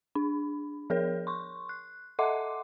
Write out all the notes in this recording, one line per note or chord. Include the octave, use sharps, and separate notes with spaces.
D4
F3 G#4 A#4 C#5
C6 C#6
F#6
A4 D#5 E5 F#5 C6 D6